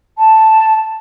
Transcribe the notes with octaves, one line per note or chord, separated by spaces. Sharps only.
A5